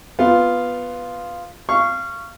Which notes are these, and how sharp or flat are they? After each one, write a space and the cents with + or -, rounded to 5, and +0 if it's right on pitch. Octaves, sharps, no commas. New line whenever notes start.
B3 +0 F4 +0
F5 -20 C#6 +0